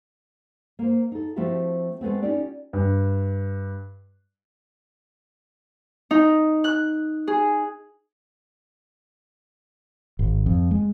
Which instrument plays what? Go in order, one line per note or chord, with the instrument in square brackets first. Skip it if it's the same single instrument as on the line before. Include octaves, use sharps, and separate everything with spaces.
[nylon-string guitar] A#3 C5
D#4 A4
F3 A3 C4 E4 F#4 G4
G#3 A3 B3 C4
C#4 D#4 F4 G4 D5
[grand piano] G2
[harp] D#4
F#6
G#4
[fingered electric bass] G#1
F2
G#3